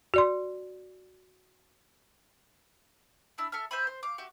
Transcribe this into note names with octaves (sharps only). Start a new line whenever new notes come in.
F#4 D5 C6
D4 E4 E6
A4 E5 A5 F6
C5 E5 G#5 B5
C5
F5 D6
F#4 G4 E5